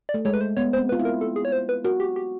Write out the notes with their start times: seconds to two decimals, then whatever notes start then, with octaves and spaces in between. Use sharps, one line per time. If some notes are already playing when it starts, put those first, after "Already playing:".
0.09 D5
0.14 A3
0.25 G#3 C#5
0.34 B4
0.41 C5
0.57 B3 C#5
0.73 C5
0.78 C4
0.89 B4
0.92 F4
0.99 E4
1.05 A#4
1.21 A4
1.36 G#4
1.45 C#5
1.52 C5
1.69 B4
1.84 F#4 A#4
2.00 G4
2.16 G4